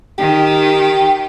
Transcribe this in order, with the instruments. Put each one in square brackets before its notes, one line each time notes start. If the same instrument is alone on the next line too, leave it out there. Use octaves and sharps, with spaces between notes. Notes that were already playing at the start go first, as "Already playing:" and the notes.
[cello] D#3 [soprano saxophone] G4